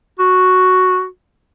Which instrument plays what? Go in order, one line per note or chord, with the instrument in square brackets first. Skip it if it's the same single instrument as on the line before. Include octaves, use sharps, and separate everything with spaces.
[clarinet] F#4